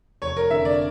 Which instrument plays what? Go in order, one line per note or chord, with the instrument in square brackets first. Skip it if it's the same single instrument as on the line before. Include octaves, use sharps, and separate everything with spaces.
[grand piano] F1 [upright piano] C#5
[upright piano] A#4
[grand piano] F2 D3 [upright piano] E5
[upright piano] D5